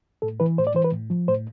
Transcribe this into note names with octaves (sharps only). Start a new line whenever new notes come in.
A2 A4
E3 B4
A2 C5
D5
E3 C5
B4
A2
F3
A2 C5